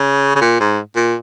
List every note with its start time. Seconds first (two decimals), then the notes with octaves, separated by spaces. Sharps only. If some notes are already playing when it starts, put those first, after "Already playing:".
Already playing: C#3
0.35 C#3
0.41 A#2
0.60 G#2
0.96 A#2